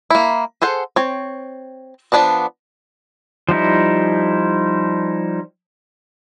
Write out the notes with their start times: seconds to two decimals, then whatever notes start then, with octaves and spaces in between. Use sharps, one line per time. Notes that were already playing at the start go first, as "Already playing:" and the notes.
0.10 A#3 E4
0.62 G#4 A4 C5 F#5
0.96 C4 C#5
2.12 F3 B3 D4 D5 A5
3.49 F3 G3 D#4 E4